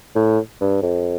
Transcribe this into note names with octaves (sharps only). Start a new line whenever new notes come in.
A2
G2
F2